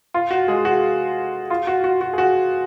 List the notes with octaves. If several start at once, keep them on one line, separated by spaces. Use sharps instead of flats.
F4
F#4
G#3 G#4
F#4
F4
F#4
F#4
F#4
G#4
F#4